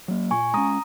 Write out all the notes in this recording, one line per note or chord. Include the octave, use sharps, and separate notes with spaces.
F#3 A#3
A#2 G#5 C#6
G#3 C#4 A#5 D#6